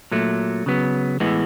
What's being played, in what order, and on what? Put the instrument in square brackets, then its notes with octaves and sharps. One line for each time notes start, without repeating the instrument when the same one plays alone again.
[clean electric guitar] A#2 F#3 A3
C#3 F#3 B3
A2 E3 G#3 B3